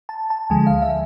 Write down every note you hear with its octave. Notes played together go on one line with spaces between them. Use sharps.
A5
A5
D2 D3 F3 G#3 G#5
F5
E5